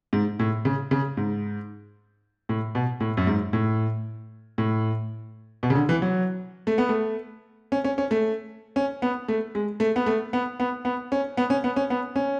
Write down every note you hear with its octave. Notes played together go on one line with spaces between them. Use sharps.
G#2
A2
C#3
C#3
G#2
A2
B2
A2
F#2
G#2
A2
A2
B2
C#3
D3
E3
F#3
A3
B3
A3
C#4
C#4
C#4
A3
C#4
B3
A3
G#3
A3
B3
A3
B3
B3
B3
C#4
B3
C#4
B3
C#4
B3
C#4